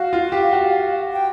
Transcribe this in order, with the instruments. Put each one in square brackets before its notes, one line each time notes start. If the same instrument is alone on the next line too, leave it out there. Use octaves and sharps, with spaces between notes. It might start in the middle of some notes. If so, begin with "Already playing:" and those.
Already playing: [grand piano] F#4 [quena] F5
[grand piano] F4
G4
F#4
[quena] G5